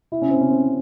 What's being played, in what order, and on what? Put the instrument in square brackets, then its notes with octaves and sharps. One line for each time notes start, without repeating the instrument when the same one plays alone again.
[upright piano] E4
C#4
C4
C#4
C4